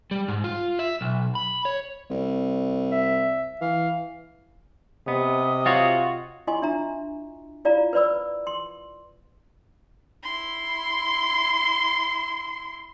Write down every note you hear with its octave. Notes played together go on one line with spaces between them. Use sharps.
G3
G#2
F4
E5
B1
B5
C#5
C2
E5
E3 F5
C3 B3 D#5
F4 F#4 C#5
E4 F4 D#5 G#5 C6 C#6
D4 E5 A#5
E4 F4 D5 F5 A#5
B4 C5 D5 B5 E6
C6
E4 C6